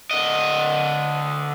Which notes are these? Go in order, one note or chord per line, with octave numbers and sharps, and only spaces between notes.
D3 D#5